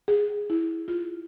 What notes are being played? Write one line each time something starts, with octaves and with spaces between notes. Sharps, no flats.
G#4
E4
F4